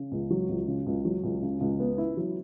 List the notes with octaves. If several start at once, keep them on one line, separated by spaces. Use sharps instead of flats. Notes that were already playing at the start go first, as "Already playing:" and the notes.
Already playing: C#3
C#2
F#3
C#2
C#3
C#2
F#3
C#2
C#3
C#2
B3
E4
F#3